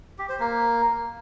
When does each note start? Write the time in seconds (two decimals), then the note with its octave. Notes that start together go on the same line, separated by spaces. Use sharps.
0.19 G4
0.29 C5
0.40 A#3